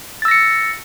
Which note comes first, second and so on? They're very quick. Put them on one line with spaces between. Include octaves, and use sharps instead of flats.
A6 E6 A#6 C#7